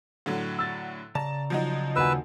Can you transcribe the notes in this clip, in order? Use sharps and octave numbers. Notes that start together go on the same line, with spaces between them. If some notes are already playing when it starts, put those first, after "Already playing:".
A2 D3 F#3
E6 A6
C#3 D5 A5 A#5
F3 F#3 D#4
D#2 F#4 B4 G#5 E6